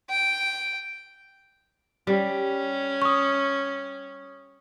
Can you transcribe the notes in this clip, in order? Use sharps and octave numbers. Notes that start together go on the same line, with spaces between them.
G5
G3 C#4
C#6 D#6